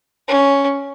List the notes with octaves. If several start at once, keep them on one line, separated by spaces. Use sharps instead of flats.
C#4